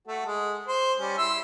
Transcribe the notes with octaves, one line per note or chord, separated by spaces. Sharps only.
A3 F#4 A4
G#3
C5
G3 C#4
E4 C6 E6